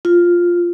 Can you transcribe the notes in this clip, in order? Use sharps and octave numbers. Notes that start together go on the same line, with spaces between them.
F4